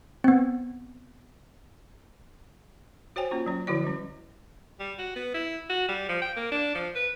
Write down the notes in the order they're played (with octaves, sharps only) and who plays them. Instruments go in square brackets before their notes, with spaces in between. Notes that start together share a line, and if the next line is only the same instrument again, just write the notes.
[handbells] B3 C4
[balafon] F#4 C5 C#5 G5 G#5
A#3 C#4 F4
F#3 C#4
D3 F3 E4 F#4 D5
G3 C#4
[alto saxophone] G3
F#4
B3
E4
F#4
G3
F3
G5
A#3
D4
F3
B4